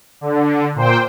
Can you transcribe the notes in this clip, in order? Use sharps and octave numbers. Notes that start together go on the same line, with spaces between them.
D3
A#2 C5 G5